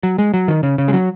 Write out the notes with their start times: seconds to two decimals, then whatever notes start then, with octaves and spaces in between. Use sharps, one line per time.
0.03 F#3
0.18 G#3
0.34 F#3
0.48 D#3
0.63 C#3
0.78 C#3
0.88 G#3
0.93 F#3